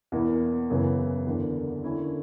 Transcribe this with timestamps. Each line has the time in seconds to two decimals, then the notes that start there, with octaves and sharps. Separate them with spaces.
0.12 E2 B2 A#3 E4
0.70 F#2 C#3 E3 B3
1.26 E2 D3 A#3
1.84 D3 A#3 C#4 E4